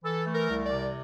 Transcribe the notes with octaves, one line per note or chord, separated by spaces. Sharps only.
E3 A4
A3
A#4
C2
D5
C3